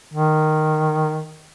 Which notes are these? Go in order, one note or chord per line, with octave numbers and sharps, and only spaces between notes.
D#3